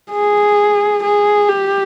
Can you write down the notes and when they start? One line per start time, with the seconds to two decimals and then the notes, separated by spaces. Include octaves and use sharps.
0.11 G#4
1.03 G#4
1.49 G4